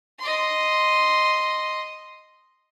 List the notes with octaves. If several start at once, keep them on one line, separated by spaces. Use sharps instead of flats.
D#5 C6